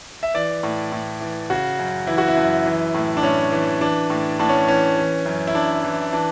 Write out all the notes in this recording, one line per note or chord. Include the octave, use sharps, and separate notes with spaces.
E5
E3 D5
A2
A2
E3
C#3 F#4
F#2
E3 E4
F#4
E4
F#2
E3
A2
D4
A2 C#4
E3
E3 D4
A2
A2 D4
C#4
E3 C#4
E3
F#2
E4
F#2 D4
E3
E3 D4